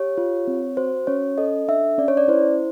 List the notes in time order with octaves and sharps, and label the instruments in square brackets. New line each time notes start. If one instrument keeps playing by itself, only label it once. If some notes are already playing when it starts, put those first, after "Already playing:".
Already playing: [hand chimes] G4 C#5
F4
C4
F#4 C5
C#4 C#5
A4 D#5
D4 E5
C#4 D5
C#5
D5
E4 C5